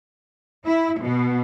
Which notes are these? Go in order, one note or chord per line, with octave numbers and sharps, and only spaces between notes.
E4
B2